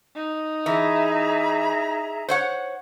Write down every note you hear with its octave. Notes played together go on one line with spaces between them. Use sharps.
D#4
E3 G#4 E5 A#5
C5 C#5 F#5